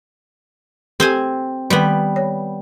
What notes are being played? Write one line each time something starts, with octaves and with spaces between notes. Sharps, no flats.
C4 G4 A4 C5 G#5
D#3 G3 B3
C#5